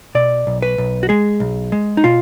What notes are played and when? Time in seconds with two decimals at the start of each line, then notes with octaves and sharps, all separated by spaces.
0.15 B2 D5
0.47 B1
0.62 B4
0.78 B1
1.03 F#4
1.09 G#3 G#4
1.40 B1
1.72 G#3
1.97 D#4
2.04 B2 F4